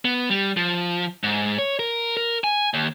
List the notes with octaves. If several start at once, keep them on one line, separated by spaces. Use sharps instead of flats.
B3
G3
F3
G#2
C#5
A#4
A#4
G#5
D#2